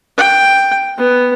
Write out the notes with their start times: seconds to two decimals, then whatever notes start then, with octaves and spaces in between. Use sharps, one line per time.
0.18 G5
0.98 B3